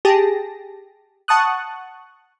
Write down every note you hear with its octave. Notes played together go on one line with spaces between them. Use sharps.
G4 G#4 A5 A#6
F#5 A5 C#6 D#6 F#6